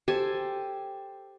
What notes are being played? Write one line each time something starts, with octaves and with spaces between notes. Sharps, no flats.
G4 A4 C5 G#5